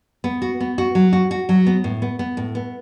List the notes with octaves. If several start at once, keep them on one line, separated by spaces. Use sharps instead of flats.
B3
F#4
B3
F#4
F#3
F#4
F#4
F#3
B3
A2
B3
B3
A2
B3